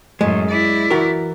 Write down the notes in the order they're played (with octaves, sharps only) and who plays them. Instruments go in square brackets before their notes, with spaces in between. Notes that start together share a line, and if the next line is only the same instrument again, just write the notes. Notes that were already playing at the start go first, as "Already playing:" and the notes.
[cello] F#2 A2 [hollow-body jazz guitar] G#3
[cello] E4 D5
[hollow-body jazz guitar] E3 F#4 A#4